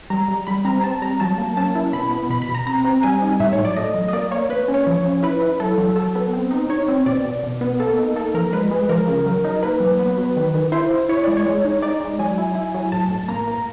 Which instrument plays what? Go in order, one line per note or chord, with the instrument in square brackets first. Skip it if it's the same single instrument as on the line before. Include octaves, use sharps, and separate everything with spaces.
[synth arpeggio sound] G3 A#5
G3
G3 B5
C4 A#5
C4 A5
G3 A#5
F#3 A5
A#3
C#4 A5
E4
B2 B5
B3
B2 B5
B5
B2
A#5
C4 A#5
C4
G3 G#5
D#4
A2 E5
C#5
F#3
D5
A3 D#5
F#3
D#5
A#3 D5
A#3 C#5
A#3 B4
C#4
C#5
F3
C#4
E4 B4
E4
F#3 A4
F#3
F#3 A4
B3
C4
D#4
D#4 C#5
C4
B2 D5
B2
B2
B3
A#3 A4
D#4
A#3 A4
F3 A#4
G#3 B4
G#3
F3 A#4
C#3
F#3
D#4
A#3 B4
F#3
B3
F#3
D#3
D#3
E4 C5
E4
E4 C#5
G#3 D5
C#5
G#3
D#4
D#4 D5
G#3
F#3 G#5
E4
E4
F#3
A2 A5
A2
A#3 A#5
A#3